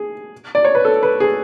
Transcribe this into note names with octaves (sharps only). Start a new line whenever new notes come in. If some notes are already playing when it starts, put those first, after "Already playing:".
Already playing: G#4
D5
C#5
B4
A4
B4
G#4